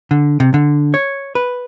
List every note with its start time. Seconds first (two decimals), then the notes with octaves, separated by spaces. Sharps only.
0.11 D3
0.40 C3
0.54 D3
0.94 C#5
1.35 B4